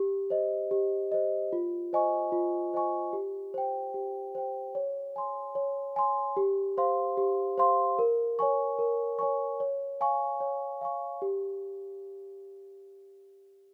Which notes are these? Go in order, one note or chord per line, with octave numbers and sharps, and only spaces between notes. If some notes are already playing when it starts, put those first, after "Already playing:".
Already playing: G4
C5 D#5
G4
C5 D#5
F4
C5 D#5 G#5 C#6
F4
C5 D#5 G#5 C#6
G4
C5 G5
G4
C5 G5
C#5
G#5 C6
C#5
G#5 C6
G4
C5 F5 C6
G4
C5 F5 C6
A#4
C#5 G#5 C#6
A#4
C#5 G#5 C#6
C#5
F5 G#5 C#6
C#5
F5 G#5 C#6
G4